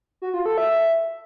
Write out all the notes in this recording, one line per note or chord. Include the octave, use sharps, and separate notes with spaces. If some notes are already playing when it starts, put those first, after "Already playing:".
F#4
F4
A4
E5